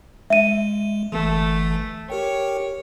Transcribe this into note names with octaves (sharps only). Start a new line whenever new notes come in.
G#3 E5 D#7
G1 E3 A3
G4 A#4 C#5 G5